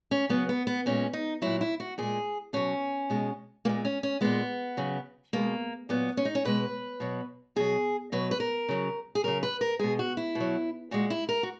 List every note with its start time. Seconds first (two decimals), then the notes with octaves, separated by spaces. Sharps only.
0.11 C#4
0.29 C#3 F#3 B3
0.49 B3
0.67 B3
0.86 A#2 G#3 C#4
1.13 D#4
1.42 A#2 F#3 E4
1.61 E4
1.80 F#4
1.98 A#2 G#3 G#4
2.53 B2 F#3 C#4
3.10 B2 G#3
3.65 A#2 G#3 A#3
3.85 C#4
4.03 C#4
4.21 A#2 G#3 B3
4.77 C#3 F#3
5.33 B2 G#3 A#3
5.89 A#2 F#3 B3
6.17 C#4
6.25 D#4
6.35 C#4
6.45 B2 G#3 B4
7.00 B2 F#3
7.56 B2 F#3 G#4
8.12 B2 F#3 B4
8.31 B4
8.40 A#4
8.69 C#3 F#3
9.15 G#4
9.24 C#3 F#3 A#4
9.43 B4
9.61 A#4
9.79 B2 G#3 G#4
9.99 F#4
10.17 E4
10.35 B2
10.40 F#3
10.91 A#2 G#3 F#4
11.10 E4
11.29 A#4
11.43 F#4